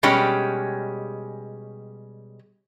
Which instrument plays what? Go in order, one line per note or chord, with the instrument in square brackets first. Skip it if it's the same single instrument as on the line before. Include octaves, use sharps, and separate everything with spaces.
[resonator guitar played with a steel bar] B2 G3 G#3 C#4 G4